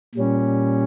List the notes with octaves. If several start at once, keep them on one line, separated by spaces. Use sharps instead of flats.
A#2 G3 C#4